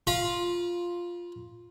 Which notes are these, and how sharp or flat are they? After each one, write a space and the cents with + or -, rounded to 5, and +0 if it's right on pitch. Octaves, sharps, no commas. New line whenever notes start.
F4 +0 B5 -45